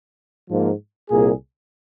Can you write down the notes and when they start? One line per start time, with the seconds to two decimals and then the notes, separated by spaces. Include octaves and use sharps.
0.48 G#2 F3 A#3
1.10 C2 A#2 A#3 G#4